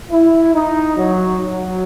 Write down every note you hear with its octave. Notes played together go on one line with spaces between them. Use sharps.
E4
D#4
F#3
F#3